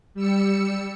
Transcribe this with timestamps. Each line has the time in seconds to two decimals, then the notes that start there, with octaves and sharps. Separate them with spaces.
0.14 G3 E6 C#7